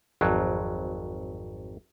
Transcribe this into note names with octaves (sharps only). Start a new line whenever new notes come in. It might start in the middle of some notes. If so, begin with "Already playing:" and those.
G#1 F2 F#3